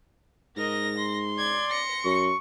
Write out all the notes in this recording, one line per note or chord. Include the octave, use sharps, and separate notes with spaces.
G#2 A#4 D#5 A#6
C6
D5 G#6
A#6 C#7
F#2 C#6